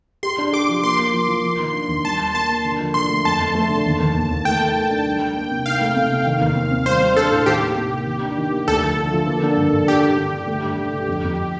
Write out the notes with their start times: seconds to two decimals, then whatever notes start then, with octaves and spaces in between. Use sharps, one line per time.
0.23 G4 C6
0.38 D4
0.53 G4 D6
0.69 F3
0.83 A#3 C6
0.98 A#3
1.13 F3
1.29 F3
1.44 A#3
1.59 D#3
1.73 D4
1.89 D#2
2.04 G3 A5
2.19 G3
2.34 A#3 A5
2.49 A#3
2.65 D3
2.80 F3
2.94 D3 C6
3.09 A3
3.25 F2 A5
3.40 F2
3.55 A3
3.69 D3
3.86 D#2
4.00 D#2
4.15 D#2
4.31 D#2
4.45 A3 G5
4.60 D#3
4.76 A3
4.90 D4
5.05 G3
5.21 G3
5.35 A#3
5.51 C3
5.66 D#4 F5
5.81 A3
5.96 C3
6.11 C3
6.26 D#3
6.41 D#2
6.56 C4
6.71 C4
6.86 G3 C5
7.02 G3
7.17 D4 A4
7.31 A2
7.46 D#3 G4
7.61 A#3
7.76 C3
7.91 A#3
8.06 D#3
8.22 D4
8.37 D#3
8.52 A#3
8.68 D2 A4
8.82 F3
8.97 D3
9.13 F3
9.27 A#3
9.43 D3
9.57 G2
9.73 G2
9.87 D4 G4
10.03 D3
10.18 D4
10.33 D3
10.47 A3
10.64 G2
10.77 D3
10.94 D3
11.08 F2
11.24 F2